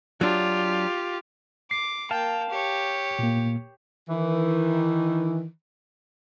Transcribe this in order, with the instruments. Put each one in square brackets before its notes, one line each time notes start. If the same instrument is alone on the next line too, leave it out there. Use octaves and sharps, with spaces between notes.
[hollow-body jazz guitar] F#3 D4 [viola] F4 G4
[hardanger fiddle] D6 [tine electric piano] C7
[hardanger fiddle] A#3 G5 [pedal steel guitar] F5 A5
[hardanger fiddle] G4 C#5
[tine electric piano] A#2 A#3
[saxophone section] D#3 E3